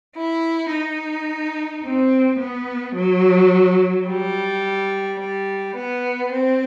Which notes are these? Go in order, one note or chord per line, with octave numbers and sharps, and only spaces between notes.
E4
D#4
C4
B3
F#3
G3
G3
B3
C4